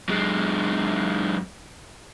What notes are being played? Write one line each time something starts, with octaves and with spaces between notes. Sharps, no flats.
F#2 G#3